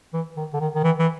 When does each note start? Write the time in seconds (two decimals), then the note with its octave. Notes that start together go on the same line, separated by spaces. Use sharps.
0.14 E3
0.37 D#3
0.53 D3
0.60 D#3
0.75 D#3
0.84 E3
0.99 E3